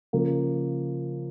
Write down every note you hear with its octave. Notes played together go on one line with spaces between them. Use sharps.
C#3 F3 A#3